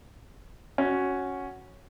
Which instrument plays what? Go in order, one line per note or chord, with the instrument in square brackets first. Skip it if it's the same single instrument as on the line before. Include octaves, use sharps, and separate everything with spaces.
[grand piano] C#4 F#4